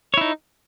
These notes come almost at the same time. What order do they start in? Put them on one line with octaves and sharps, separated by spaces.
C#5 E4 D#4